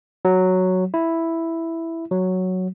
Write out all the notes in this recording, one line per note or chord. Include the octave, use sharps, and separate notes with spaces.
F#3
E4
F#3